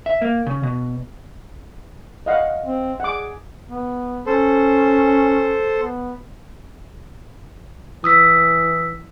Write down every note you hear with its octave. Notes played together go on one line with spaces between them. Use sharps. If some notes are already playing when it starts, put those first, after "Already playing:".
E5
A#3
C#3
B2
D#5 F5 F#5
C4
G#4 F#5 D6
B3
C#4 A4 C5
B3
E3 D#6 E6 B6